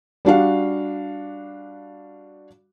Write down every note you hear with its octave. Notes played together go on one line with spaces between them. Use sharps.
G3 D4 F#4 F5